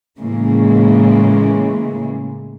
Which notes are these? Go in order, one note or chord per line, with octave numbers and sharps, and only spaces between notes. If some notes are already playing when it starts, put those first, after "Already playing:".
A2 C#3 E3 G#3 A#3